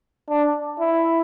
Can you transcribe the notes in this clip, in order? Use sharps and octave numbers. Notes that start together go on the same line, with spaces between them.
D4
E4